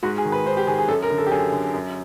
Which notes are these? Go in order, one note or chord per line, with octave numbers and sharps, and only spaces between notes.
G#2 F#4
G#4
D#3
B4
G#2 C5
G4
D#3 G#4
G#4
F#2 A4
A#4
D3
A4
G4
F#2 G#4
D3
F#2